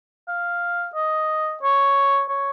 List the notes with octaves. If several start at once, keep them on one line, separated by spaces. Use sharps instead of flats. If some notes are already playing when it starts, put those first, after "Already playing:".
F5
D#5
C#5
C#5